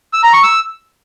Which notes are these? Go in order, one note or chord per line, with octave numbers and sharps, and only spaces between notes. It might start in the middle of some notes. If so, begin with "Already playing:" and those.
E6
A#5
C#6
E6